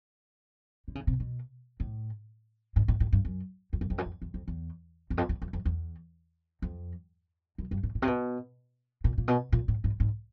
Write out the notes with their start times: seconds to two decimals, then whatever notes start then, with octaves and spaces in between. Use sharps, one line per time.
0.88 D3
0.95 C#3
1.07 C3
1.20 B2
1.80 A2
2.76 G#2
2.88 A2
3.00 A2
3.12 G2
3.25 F#2
3.73 F2
3.81 F#2
3.90 F2
3.98 F#2
4.05 F2
4.22 E2
4.34 F2
4.48 E2
5.10 E2
5.17 F2
5.29 E2
5.42 F2
5.53 F2
5.65 E2
6.62 F2
7.58 F#2
7.71 G2
7.83 A2
7.95 A#2
8.02 C3
8.07 B2
9.04 A#2
9.18 A#2
9.28 B2
9.52 A#2
9.68 A2
9.84 G#2
10.00 G#2